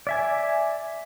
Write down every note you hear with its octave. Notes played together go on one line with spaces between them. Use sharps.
D5 E5 G#5